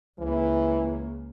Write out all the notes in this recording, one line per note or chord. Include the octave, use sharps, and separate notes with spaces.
C#2 E3 A#3